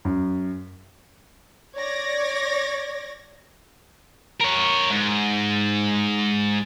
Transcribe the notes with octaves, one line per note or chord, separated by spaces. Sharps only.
F#2
C#5 D5 G#6 A#6
A#4 C#5
G#2